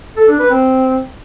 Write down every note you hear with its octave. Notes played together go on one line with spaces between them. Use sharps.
A4
D4
B4
C4